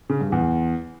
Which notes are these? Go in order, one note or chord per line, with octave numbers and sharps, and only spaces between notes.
C#3
G2
E2